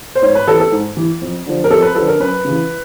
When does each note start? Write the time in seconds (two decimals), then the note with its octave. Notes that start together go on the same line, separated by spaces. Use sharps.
0.15 C5
0.22 G#2 C#5
0.35 B4
0.47 E3 A4
0.60 A4
0.72 G#2
0.97 E3
1.21 F2
1.46 D3 F3
1.64 A#4
1.71 F2 A4
1.82 B4
1.95 D3 F3 A4
2.08 A#4
2.20 F#2 B4
2.45 C#3 E3